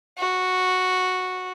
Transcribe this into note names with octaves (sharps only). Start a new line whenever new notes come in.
F#4